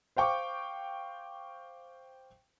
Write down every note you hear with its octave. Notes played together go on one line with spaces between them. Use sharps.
C5 F5 G5 C#6 D6